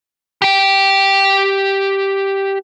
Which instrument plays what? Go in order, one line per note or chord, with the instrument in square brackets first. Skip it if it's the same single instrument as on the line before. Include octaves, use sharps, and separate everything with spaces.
[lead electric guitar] G4 G5